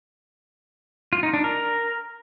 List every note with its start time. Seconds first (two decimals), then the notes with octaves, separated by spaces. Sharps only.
1.13 F4
1.23 D#4
1.34 D4
1.44 A#4